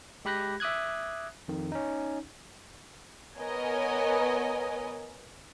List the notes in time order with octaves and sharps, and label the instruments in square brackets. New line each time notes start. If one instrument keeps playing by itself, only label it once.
[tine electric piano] G#3 G4 B5 F#6 G6 A#6
E5 D6 D#6 F#6 G#6
F2 D#3
C#4 D#4
[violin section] B3 A#4 C#5 D#5 G#5